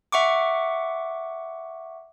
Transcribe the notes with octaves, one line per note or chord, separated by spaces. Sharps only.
E5 F#5 C#6 D6